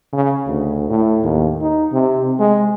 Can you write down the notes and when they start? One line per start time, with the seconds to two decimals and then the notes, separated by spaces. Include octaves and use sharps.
0.13 C#3
0.47 D2
0.89 A2
1.23 D#2
1.61 D#4
1.92 C3
2.39 G#3